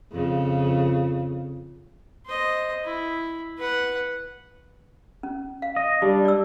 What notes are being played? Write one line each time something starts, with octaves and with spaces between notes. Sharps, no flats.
F2 C#3
C5 D#5
E4
B4 F#5
C#4
F5
D#5
G3 D4 G4
D5 E6